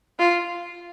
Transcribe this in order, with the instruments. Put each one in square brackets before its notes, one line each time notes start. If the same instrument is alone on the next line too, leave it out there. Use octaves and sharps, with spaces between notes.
[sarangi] F4